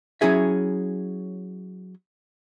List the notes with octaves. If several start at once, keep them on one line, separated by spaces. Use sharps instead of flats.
F#3 C#4 E4 G#4 E5